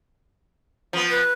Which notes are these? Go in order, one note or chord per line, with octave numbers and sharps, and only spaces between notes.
F3 B3
B4